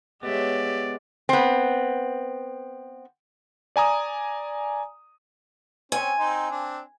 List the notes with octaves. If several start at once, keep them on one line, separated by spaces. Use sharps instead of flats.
G#3 B3 G4 C#5 D5 E5
B3 C4
D5 G#5 A#5 D#6
C4 C#4 G#5
C4 D#4 C5
C4 D4